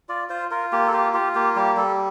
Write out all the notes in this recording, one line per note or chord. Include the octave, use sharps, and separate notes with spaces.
F4 D5
F4 C5
F4 A#4
A#3 G4
A4
F4 G4
F4 G4
A#3 G4
G3 G4
G3 A4